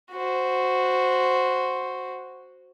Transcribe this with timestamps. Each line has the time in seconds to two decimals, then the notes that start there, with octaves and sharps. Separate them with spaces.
0.12 F#4 C5